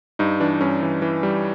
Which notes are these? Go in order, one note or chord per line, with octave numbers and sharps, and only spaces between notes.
G2 D#4
E3 D4
G2 C#4
E3
E3
G3